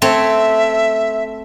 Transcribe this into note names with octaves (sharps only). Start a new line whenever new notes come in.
A3 C4 C#5 E5